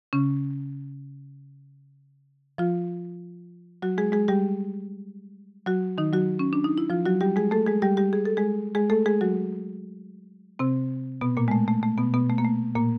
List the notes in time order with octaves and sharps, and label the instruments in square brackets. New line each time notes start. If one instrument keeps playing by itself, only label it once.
[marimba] C#3 C#4
F3 F4
F#3 F#4
G#3 G#4
G#3 G#4
G3 G4
F#3 F#4
D#3 D#4
F#3 F#4
C#4
D4
D#4
E4
F3 F4
F#3 F#4
G3 G4
G#3 G#4
A3 A4
G#3 G#4
G3 G4
G3 G4
G#4
A4
G#3 G#4
G#3 G#4
A3 A4
G#3 G#4
F#3 F#4
C3 C4
B2 B3
A#2 A#3
G#3
A3
A3
A3
B2 B3
B2 B3
A3
A#3
A3
A#2 A#3